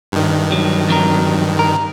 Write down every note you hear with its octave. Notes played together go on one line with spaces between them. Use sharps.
G2 D#3
F#3
F2 F#3 A#4
A#4